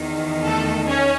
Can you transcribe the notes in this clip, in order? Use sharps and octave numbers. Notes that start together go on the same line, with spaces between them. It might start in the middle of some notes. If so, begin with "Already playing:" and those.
Already playing: E2 D#3
A3 A4
C#4 C#5